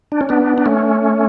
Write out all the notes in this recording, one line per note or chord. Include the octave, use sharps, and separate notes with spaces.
D4
C#4
B3 D4
D4
A3 C#4